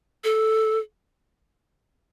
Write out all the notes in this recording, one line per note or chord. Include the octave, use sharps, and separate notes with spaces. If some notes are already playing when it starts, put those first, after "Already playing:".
A4